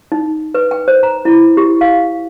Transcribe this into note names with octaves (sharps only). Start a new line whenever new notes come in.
D#4
B4
G5
C5
A#5
E4
G4
F5